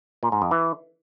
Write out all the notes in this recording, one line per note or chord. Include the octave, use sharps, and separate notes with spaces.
A#2
G#2
F2
E3